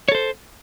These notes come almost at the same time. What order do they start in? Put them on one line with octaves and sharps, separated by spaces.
C#5 A4 C5